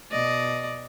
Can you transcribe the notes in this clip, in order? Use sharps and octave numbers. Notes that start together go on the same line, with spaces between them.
B2 D5 D#5